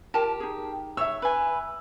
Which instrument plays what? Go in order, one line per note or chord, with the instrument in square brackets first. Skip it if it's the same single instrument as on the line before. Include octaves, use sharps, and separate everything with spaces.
[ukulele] F4 A#4 A5 [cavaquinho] G4
[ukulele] D#4 G#4
[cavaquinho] C#5 [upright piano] E5 E6
[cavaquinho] B4 G#5